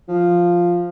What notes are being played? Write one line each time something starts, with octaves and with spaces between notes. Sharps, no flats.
F3